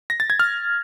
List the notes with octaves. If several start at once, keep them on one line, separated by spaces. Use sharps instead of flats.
A#6
A6
G#6
F6